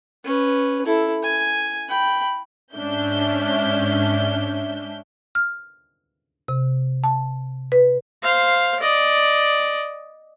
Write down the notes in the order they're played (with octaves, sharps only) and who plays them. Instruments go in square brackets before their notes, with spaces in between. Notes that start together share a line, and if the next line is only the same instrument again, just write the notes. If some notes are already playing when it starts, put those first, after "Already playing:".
[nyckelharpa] C#4 B4
E4 A4
G#5
G5 B5
[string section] G#2 C#4 D4 E5 G6
[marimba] F6
C3
A5
B4
[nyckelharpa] C5 F5
D5 D#5